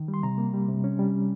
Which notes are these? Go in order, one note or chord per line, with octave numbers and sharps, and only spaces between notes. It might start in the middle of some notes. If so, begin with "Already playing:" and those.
Already playing: D#3
G3
C6
C3 A#5
A#3
G3
C3
C#4
G3